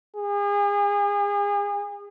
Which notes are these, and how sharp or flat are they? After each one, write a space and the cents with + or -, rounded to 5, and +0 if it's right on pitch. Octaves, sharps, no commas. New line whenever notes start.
G#4 -35